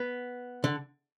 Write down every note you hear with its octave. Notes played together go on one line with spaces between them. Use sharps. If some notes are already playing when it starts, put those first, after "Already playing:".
Already playing: B3
D3